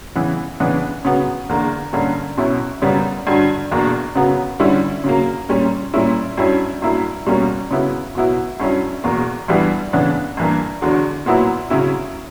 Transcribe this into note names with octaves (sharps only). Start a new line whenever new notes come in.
C#3 E3 B3 E4
C#3 E3 B3 D4
C#3 F#3 B3
E2 D3 A#3
G2 D3 A#3 C#4
B2 F#3 C#4 E4
F#2 C#3 G3 B3
G2 D3 F#3
E2 B2 A#3 D4
F#2 C#3 F#3 B3
D3 G3 C#4 E4
C#3 F#3 A#3
A#2 G3 C#4
A#2 G3 C#4 E4
G2 F#3 C#4 E4
G2 F#3 A#3 E4
B2 G3 A#3 C#4
C#3 F#3 B3 E4
B2 F#3 B3 E4
G2 F#3 C#4 E4
E2 B2 A#3
G2 E3 G3 B3 E4
C#3 E3 B3 D4
G2 E3 A#3
E2 D3 F#3
A#2 F#3 B3 E4
C#3 F#3 C#4 E4